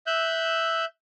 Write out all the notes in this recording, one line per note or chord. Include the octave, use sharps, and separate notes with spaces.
E5 E6 F#6 G6